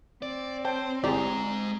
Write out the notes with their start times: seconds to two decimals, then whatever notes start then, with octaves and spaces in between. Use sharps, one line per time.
0.22 C4 D5
0.65 C5 C#5 G5 A5
1.04 G1 G#3 E4 G4 G#4 D5 A#5